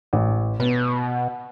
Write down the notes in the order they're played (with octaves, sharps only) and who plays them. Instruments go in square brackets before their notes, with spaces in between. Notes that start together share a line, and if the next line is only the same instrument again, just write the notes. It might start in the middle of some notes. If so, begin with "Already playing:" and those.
[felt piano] A1
[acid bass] B2 [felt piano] B3